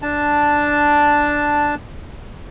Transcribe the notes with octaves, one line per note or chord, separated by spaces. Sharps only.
D4 A5